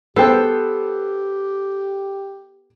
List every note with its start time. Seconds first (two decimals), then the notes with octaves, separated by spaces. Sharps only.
0.16 B3 G4 A4 C5 G5